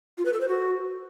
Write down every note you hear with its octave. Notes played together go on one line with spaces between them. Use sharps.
F4
B4
A4
C5
F#4